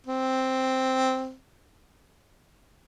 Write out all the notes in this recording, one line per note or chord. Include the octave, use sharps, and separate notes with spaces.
C4